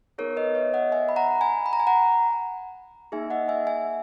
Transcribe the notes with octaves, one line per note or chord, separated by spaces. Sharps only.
B3 D#4 G#4 A#4 C#5
B4 D#5
C#5 E5
D#5 F#5
E5 G#5
B5
F#5 A#5
G#5 B5
B5
A#5
G#5
F#5 A#5
A#3 D#4 G#4 E5 G#5
D#5 F#5
E5 G#5
E5 G#5